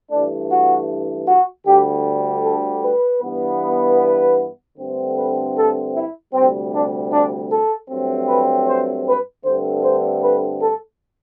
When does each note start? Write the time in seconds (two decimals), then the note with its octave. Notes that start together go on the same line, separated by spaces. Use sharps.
0.11 G2 E3 A3 D4
0.50 F#4
1.28 F#4
1.66 D2 D3 G3 G4
2.45 A4
2.83 B4
3.22 G2 E3 B3
4.00 B4
4.78 G2 D3 A3 C4
5.16 B4
5.56 A4
5.94 E4
6.33 D2 C3 G3 C4
6.73 D4
7.11 D4
7.50 A4
7.89 G2 F#3 A3 C4
8.28 B4
8.67 C5
9.05 B4
9.44 G2 D3 A3 C4 C5
9.83 C5
10.22 B4
10.61 A4